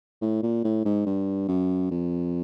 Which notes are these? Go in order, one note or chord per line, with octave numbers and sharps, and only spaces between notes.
A2
A#2
A2
G#2
G2
F#2
F2